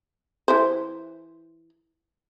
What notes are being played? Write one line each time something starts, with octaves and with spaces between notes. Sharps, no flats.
E3 E4 C5